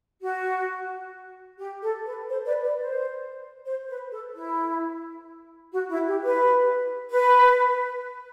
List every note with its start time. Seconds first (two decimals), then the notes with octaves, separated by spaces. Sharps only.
0.22 F#4
1.59 G4
1.83 A4
2.05 B4
2.29 C5
2.45 B4 D5
2.62 B4 D5
2.79 C5
3.66 C5
3.88 B4
4.11 A4
4.35 E4
5.73 F#4
5.90 E4
6.08 G4
6.25 B4
7.10 B4